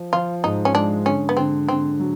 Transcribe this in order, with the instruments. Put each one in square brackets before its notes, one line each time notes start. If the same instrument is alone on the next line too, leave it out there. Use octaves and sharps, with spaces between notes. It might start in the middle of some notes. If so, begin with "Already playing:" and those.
Already playing: [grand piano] F3
[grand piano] F3 [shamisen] F4
[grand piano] G#2 [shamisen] D#4
[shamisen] C#4
[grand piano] G#3 [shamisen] D4
[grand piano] D3 [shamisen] C#4
[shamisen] B3
[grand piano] D3 [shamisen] C4
[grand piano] D3 [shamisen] C4
[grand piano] F#3